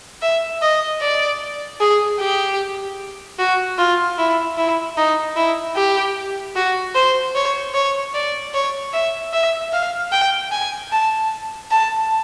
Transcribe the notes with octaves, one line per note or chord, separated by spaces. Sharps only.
E5
D#5
D5
G#4
G4
F#4
F4
E4
E4
D#4
E4
G4
F#4
C5
C#5
C#5
D5
C#5
E5
E5
F5
G5
G#5
A5
A5